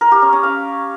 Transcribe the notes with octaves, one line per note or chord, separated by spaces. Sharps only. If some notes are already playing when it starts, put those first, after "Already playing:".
A#4
G4
C#4
C#4
F5